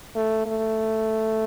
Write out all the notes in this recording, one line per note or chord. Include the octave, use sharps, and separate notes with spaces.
A3
A3